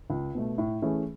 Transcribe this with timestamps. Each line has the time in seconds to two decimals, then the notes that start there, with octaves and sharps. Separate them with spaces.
0.10 C#2
0.35 B2 A3
0.58 A2
0.82 E3 A3 C#4 G#4